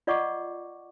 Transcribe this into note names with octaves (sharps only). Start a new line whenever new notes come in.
F4 D5 D#5 F#5 C#6 D6